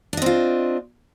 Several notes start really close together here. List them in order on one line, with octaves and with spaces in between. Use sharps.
D4 D#5 C4 F4